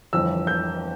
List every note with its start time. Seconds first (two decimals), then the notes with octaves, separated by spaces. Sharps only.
0.13 G1 F2 E3 E6
0.47 G6